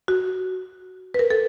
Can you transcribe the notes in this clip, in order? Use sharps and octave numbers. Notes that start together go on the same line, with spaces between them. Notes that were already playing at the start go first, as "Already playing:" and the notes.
F#4
B4
A#4
A4